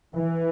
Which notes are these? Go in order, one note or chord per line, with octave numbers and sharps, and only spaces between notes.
E3